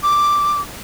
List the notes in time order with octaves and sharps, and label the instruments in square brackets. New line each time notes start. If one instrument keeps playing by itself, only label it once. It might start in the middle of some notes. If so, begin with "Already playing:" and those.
[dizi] D6